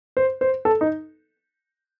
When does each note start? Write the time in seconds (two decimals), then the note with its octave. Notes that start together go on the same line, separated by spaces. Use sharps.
0.17 C5
0.41 C5
0.65 A4
0.81 D#4